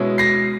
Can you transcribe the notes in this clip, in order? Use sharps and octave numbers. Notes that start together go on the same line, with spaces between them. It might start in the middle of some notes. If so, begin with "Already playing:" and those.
Already playing: B2 G#3 C#4 E4
A#6 C7